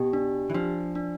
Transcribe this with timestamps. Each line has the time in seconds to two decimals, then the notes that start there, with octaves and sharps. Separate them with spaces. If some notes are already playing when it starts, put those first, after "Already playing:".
Already playing: B2 G4
0.13 D4
0.50 E3
0.54 F3 D4
0.95 D4